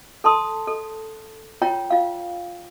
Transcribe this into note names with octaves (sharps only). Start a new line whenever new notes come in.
A4 A5 C6 D#6
A4
F4 C#5 G5 A#5
F4 F5